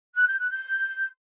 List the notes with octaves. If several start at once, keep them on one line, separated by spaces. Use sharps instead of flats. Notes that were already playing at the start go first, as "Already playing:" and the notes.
F#6
G6
F#6
G6